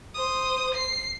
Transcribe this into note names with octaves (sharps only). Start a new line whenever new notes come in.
C5 D#6
C7